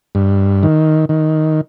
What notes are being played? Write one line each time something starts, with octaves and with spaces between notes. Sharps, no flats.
G2
D#3
D#3